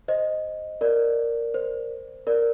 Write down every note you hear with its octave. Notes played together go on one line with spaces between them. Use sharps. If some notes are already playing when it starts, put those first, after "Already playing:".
C5 D#5
A#4 D5
C5
A#4 D5